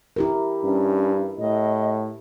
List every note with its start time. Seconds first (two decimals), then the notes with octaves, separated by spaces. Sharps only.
0.16 E4 G4 A#4
0.64 G2 C#4
1.38 A2 D#5